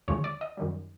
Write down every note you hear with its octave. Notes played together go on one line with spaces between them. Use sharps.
D#2 D3 F3 G#3 C#5
D5
D#5
F#2 D#3 G3